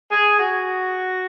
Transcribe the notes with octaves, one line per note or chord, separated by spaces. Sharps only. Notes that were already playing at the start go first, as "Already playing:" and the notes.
G#4
F#4